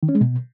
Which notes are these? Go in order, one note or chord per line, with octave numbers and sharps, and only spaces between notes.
D#3
C#4
G#3
B2